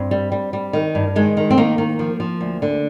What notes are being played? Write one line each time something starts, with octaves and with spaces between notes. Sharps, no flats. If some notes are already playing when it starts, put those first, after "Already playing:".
Already playing: G2 C4
G3
G3
G3
D#3
G2
D#3 G#3
D#3
C4
D#3 A#3
D#3
F3
F3
D2
D3